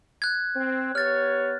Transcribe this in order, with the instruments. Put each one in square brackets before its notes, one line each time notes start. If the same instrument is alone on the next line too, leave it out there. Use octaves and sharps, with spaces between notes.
[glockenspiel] F#6 G#6
[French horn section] C4
[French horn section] B3 G4 C#5 [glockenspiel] F6 A6